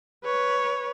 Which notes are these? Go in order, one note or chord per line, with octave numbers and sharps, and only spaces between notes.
B4 C#5